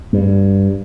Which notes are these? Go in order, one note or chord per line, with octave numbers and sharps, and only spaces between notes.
G2